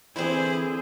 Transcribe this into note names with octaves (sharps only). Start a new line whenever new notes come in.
D3 E3 C4 E4 G#4 C5 B5